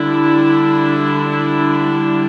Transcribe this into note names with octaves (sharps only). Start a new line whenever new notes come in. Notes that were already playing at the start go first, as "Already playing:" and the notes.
Already playing: D3 G3 D4 E4
E4